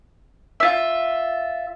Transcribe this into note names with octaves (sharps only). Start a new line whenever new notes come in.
F4 E5